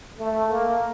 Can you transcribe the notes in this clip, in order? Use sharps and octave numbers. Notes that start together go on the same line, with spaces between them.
A3
A#3